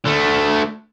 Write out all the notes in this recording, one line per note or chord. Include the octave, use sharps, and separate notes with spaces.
D3 A3